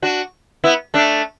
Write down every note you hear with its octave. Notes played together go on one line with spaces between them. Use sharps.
D4 F#4
B3 E4
A3 D4